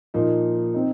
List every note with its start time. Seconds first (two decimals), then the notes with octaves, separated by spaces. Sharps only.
0.14 A#2 F3 A#3 D#4
0.74 C4 D#4